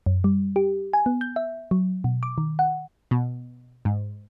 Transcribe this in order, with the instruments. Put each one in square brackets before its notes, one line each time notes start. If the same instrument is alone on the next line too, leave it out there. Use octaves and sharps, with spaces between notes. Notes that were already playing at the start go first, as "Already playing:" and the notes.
[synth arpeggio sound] F#2
G3
G4
G#5
B3
G6
E5
F#3
B2
D6
D#3
F#5
B2
G#2